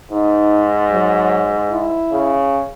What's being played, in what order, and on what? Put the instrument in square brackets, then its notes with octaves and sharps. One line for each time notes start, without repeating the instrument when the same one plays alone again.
[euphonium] G#2 [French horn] D#4
[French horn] F#3
E4
[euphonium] C#3